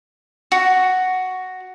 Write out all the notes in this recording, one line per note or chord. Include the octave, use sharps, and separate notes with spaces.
F#4